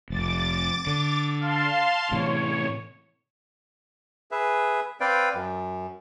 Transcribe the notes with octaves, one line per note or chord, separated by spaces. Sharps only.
F1 D6 A6
D3
F5 A5 C6
A2 C3 E3 C#5
G#4 B4 E5
C4 B4 D5 F5 G5
F#2